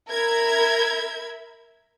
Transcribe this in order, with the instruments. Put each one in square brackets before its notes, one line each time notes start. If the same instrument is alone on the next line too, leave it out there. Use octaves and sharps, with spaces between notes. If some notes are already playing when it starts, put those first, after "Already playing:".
[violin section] A#4 E5 B5 G#6